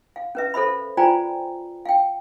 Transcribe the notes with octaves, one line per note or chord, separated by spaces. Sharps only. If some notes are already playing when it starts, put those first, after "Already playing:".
F5
C#4 B4 E5
A4 C5 E5 B5
F4 C5 D5 G5 G#5 A#5
F5 G5